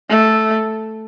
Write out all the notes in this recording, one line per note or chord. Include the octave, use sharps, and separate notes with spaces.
A3